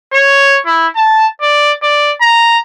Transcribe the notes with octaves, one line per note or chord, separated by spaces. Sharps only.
C#5
E4
A5
D5
D5
A#5